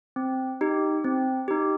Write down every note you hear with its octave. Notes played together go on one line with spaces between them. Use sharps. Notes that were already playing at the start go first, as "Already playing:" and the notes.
C4
D#4 G4
C4
D#4 G4